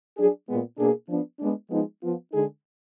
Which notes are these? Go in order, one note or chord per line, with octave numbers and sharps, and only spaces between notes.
F#3 D4 G#4
A#2 G#3 B3
B2 A#3 D4 G#4
F3 B3 D4
G#3 B3 D4
F3 G#3 B3 D#4
F3 B3 F4
D3 G#3 D#4 G#4